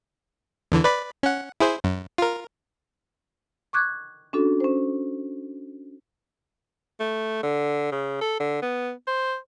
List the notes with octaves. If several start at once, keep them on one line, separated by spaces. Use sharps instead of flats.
E2 D3 E3
B4 D5 B5
C#4 F#5
E4 G#4 C5
F#2
F4 A#4
C#6 D6 F#6 G#6
C#4 D4 F#4 A4
C#4 C5
A3
D3
C#3
A4
D3
B3
C5